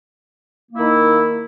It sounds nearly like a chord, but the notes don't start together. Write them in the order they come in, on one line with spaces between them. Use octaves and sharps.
A#3 E4 D#3